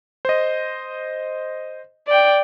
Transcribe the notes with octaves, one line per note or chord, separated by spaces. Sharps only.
C5 D#5
D5 G5